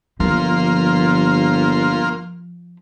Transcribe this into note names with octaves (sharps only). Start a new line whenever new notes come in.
G1 F3 A#3 F4 C6